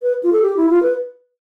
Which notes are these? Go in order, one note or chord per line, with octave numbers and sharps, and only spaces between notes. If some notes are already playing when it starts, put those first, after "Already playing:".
B4
F4
A4
G4
E4
F4
B4